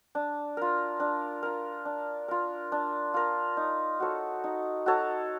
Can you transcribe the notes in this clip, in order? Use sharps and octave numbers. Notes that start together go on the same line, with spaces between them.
D4
F4 A#4
D4
F4 A#4
D4
F4 A#4
D4
F4 A#4
D#4
F#4 A4 C#5
D#4
F#4 A4 C#5